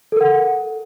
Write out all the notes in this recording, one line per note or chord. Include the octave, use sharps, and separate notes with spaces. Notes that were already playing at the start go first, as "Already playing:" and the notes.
A4 A#4 F#5